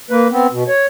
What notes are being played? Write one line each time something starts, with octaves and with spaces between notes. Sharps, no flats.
A#3 B4
B3 C4
B2
C#5